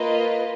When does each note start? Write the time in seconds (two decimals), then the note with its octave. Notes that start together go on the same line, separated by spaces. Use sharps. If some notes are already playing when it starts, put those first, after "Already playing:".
Already playing: A#3 F4 B4 D#5